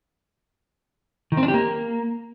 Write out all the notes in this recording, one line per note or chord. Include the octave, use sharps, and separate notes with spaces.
D#3
C4
D4
G4
A#3